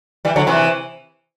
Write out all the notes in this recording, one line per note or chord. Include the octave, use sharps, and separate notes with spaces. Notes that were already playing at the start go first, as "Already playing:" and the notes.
E3 G3
D3 F#3
C3 E3